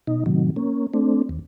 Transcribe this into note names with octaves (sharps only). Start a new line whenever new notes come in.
B2 D#4
A2 C3 D#3 F#3
A#3 C#4
A3 C4 D4
D#2